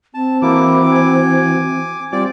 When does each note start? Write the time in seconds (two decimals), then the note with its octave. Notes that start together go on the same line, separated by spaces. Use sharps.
0.14 C4 A5
0.42 E3 A#3 E4 F#4 D6
0.91 G#5
2.12 G3 C4 F4 D5 D6